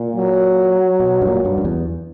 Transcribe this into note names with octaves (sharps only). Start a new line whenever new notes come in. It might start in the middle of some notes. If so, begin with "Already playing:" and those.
Already playing: A#2
F#3
B2
G2
A#2
G2
F#2
E2